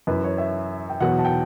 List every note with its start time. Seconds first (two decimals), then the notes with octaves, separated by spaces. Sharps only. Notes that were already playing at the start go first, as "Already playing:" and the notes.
0.07 F#2 E3 B4
0.24 C#5
0.38 E5
0.90 G5
1.01 E2 B2 F#3 F#5
1.19 A5
1.25 G5